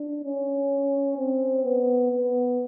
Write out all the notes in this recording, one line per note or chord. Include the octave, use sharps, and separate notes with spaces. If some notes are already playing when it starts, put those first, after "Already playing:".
Already playing: D4
C#4
C4
B3
B3